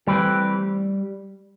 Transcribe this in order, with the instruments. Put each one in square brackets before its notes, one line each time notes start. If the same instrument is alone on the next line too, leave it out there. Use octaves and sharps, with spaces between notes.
[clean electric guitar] E3 A3 C4 G4 B4 [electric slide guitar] G3